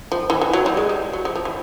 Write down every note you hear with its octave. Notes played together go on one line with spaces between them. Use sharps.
F3
E3
E3
F#3
G3
G#3
G3
F#3
F3
F3
E3